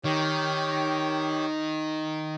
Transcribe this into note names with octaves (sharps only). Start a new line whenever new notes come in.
D#3 G4 C#5